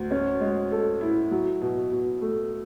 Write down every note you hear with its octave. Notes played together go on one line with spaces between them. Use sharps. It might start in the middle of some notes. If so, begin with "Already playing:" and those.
Already playing: D2
C#4
G#3
A4
E4
F#3
B2
B2
A3